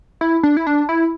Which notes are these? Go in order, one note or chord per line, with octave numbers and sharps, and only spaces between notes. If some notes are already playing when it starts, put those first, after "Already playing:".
E4
D4
E4
D4
E4